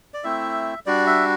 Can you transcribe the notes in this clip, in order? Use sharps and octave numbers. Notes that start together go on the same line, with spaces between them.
D5
A3 C4 E4 E5
G3 D4 F#4 D5
E5